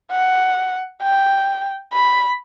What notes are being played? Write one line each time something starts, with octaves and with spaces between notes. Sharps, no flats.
F#5
G5
B5